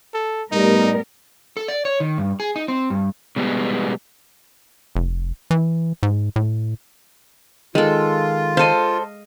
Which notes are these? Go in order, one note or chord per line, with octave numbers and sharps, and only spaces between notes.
A4
A2 G3 B3 D#4 A#4
A4
D5
C#5
D#3
G2
G#4
D#4
C4
G2
B2 G3 G#3 B3
F1
E3
G#2
A2
D#3 G#3 F4 A4
A4 C5 D#5 F5